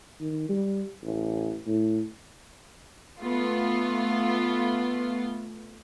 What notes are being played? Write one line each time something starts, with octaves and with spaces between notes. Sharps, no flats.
D#3
G3
A1
A2
A3 B3 F4